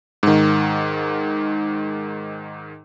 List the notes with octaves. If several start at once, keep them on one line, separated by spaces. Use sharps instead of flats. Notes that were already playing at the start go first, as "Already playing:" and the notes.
G#2 D#3